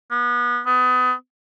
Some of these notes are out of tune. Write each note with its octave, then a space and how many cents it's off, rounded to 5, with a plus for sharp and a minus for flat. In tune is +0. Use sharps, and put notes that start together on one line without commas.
B3 -30
B3 +30